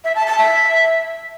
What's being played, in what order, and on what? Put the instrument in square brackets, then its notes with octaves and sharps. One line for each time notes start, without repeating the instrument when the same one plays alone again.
[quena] E5
A5
A5
E5